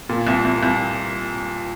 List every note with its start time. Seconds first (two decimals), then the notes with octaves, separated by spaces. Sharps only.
0.09 A#2
0.27 C2
0.45 C2
0.63 C2